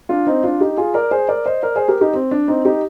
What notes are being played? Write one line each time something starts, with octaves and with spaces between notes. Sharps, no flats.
D4 F4
C4 D#4
D4 F4
D#4 G4
F4 G#4
A#4 D5
G#4 C5
A#4 D5
C5 D#5
A#4 D5
G#4 C5
G4 A#4
D#4 G4
C4
D4
C4 D#4
D#4 G4